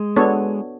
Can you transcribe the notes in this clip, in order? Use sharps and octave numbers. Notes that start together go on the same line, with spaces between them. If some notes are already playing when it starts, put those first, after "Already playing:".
Already playing: G#3
B3 D4 F#4 A4 C#5